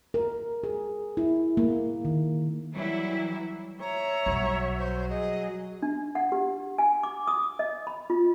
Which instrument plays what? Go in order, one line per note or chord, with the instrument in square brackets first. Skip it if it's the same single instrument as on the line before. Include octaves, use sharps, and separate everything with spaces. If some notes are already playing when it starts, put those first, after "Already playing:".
[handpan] A#4
G#4
E4
A#3
D#3
[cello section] E3 F#3 G3 E4
[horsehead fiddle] C#5 E5 [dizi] A#5
[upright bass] B1 G3 [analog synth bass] F#3
[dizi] C5
[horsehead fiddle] G#4 [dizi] D#5
[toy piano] D4
F#5
G4
G#5
D6
D#6
D#5
B5
F4